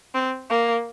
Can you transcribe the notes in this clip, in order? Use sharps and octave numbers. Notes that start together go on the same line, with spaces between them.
C4
A#3